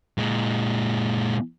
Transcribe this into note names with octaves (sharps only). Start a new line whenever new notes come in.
A#2 G#3